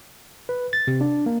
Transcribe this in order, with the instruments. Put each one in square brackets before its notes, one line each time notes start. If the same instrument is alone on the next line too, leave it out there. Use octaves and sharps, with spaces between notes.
[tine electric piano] B4
A6
C3
D4
A#3